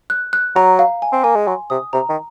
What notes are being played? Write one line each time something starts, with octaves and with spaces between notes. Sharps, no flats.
F#6
F#6
F#3 A#5
F5
G#5
C4
A#3 G#5
G#3
F#3 C6
C3 D#6
C3 A#5
D#3